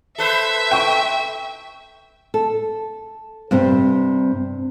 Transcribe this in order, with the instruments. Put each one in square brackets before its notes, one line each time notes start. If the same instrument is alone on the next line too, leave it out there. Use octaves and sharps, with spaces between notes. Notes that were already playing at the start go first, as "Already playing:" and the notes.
[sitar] A4 B4 C5 [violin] E5
[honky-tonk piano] G5 C#6
[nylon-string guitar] A4
G2 C3 C4